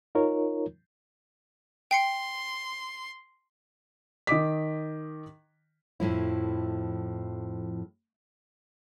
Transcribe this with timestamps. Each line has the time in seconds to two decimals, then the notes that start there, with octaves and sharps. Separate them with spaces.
0.15 D#4 F4 A#4 C#5
1.91 G5 C6 C7 C#7
4.27 D#3 D#5 D6 B6
6.00 F2 A2 F3 E4